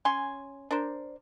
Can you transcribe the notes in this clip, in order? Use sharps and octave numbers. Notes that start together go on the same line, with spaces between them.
C#4 G#5 C6
D4 A#4 C5